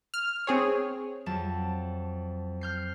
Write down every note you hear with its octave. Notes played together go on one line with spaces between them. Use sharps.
F6
C4 G#4 C#5
F2 F#3 A5
F6 G6 C7